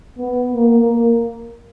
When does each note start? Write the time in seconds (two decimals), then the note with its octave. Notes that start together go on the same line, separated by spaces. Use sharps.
0.18 B3
0.54 A#3
0.89 A#3